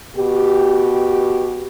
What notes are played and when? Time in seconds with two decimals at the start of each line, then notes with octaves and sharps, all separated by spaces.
0.16 B2 F#4 G4